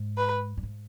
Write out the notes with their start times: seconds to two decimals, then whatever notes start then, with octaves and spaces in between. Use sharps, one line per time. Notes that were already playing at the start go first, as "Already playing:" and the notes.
Already playing: G#2
0.18 B4
0.57 F#2
0.63 G#2